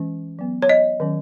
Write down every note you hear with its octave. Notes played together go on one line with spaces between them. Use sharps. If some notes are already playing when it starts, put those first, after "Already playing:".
Already playing: E3 G#3 C#4
F#3 B3
C#5
D#5
D#3 F#3 C#4